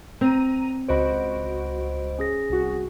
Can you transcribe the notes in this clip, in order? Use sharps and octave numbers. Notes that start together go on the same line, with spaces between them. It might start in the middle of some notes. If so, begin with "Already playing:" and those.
C4 A#5 D#7
C#2 F#4 C5 D#5 B5 D7
C#4 G#4 A#6
C2 F#4